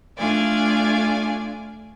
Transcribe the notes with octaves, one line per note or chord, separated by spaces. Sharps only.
A3 D4 F4 D5 G#5